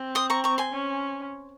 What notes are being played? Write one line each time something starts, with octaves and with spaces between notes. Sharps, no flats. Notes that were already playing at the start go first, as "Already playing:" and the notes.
Already playing: C4
C6 D#6
A#5 C#6
A#5 C#6
G#5 C6
C#4